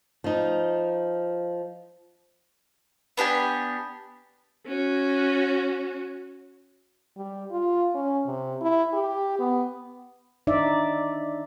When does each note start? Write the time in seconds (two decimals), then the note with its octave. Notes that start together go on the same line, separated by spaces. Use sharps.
0.24 F3 D#4
3.17 B3 D4 G4 G#5
4.67 C#4 F#4
7.16 G3
7.51 F4
7.95 C#4
8.26 C3
8.61 E4
8.93 G4
9.39 B3
10.47 D4 D#4 D5 E5